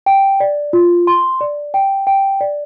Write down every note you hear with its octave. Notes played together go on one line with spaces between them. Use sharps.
G5
D5
F4
C6
D5
G5
G5
D5